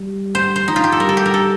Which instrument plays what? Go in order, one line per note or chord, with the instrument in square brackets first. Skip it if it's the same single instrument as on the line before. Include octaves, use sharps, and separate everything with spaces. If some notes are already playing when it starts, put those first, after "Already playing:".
Already playing: [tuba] G3
[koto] C5
C5
[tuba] F3 [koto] D#4
[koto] F4
G4
A4
[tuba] G3 [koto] A#4
[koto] A4
G4
A#4
A4